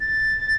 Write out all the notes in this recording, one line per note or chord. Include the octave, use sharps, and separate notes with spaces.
A6